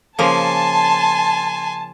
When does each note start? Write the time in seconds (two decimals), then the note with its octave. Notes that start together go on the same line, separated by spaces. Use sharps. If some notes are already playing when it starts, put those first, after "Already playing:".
0.19 C#3 F3 A#3 G#5 A5 C6